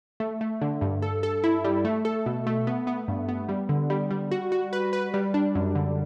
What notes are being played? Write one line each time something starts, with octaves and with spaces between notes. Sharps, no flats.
A3
A3
D3
G2
A4
A4
E4
G3
A3
A4
B2
A3
B3
B3
G2
B3
G3
D3
G3
G3
F#4
F#4
B4
B4
G3
D4
F#2
D3